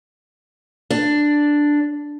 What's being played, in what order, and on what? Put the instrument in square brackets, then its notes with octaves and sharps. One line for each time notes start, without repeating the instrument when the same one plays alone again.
[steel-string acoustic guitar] D4